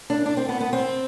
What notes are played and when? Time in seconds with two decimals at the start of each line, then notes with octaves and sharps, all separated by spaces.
0.10 D4
0.26 D4
0.37 C4
0.49 B3
0.61 B3
0.73 C4